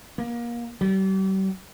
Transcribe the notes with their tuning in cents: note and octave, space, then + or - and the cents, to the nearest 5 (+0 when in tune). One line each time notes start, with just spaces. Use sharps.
A#3 +25
G3 -40